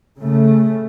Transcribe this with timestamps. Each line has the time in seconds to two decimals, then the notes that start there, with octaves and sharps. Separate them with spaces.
0.19 C#3 A3